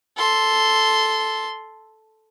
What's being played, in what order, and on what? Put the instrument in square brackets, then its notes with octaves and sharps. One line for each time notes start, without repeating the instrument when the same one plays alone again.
[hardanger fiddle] A4 C6